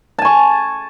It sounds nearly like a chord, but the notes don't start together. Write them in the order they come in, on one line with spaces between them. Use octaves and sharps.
A5 G#5 C#6